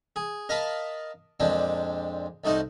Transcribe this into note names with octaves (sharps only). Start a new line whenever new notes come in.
G#4
A#4 D#5 F5 A5 B5
F2 A#2 G#3 C4 D4
C2 A3 D#4 F#4 C5